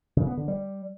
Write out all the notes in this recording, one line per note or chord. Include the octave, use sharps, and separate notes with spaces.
C#3
B3
D3
G3